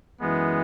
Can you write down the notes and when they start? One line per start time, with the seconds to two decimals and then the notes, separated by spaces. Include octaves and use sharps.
0.21 F#2 E3 G#3 B3